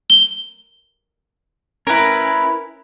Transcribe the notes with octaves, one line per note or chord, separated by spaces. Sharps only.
G7
C#4 E4 A#4 B4